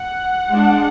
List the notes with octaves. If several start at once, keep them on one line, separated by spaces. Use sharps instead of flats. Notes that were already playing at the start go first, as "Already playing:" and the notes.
Already playing: F#5
G#3 D4